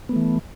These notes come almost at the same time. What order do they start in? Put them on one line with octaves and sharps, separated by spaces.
B3 A3 E3